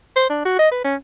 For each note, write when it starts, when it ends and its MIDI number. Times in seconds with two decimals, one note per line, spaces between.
0.16 0.28 72
0.30 0.40 62
0.45 0.55 66
0.59 0.70 75
0.72 0.81 71
0.84 0.95 61